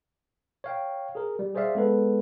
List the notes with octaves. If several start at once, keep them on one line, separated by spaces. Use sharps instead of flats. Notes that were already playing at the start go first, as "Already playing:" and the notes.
C#5 F5 G5
G#4 A#4
G3
G#4 C5 D5 E5 F5
G#3 B3 A4 B4